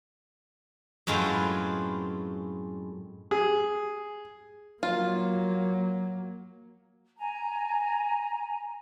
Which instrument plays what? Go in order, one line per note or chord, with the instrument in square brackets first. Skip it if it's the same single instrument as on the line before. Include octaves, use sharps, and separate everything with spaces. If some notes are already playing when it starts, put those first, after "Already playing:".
[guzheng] F#2 A2 G#3 C4 F4 B4
[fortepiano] G#4
[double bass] F#3 A#3 [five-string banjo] F4
[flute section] G#5 A#5